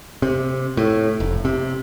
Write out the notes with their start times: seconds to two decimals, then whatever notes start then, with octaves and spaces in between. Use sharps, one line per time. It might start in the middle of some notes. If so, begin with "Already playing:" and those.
0.22 C3
0.77 A2
1.20 F1
1.45 C3